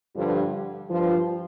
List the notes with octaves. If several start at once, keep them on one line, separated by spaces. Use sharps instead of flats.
G2 D3 F3
G2 F3